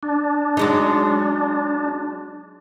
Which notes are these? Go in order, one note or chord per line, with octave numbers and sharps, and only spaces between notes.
D4
F#3 G#3 D#4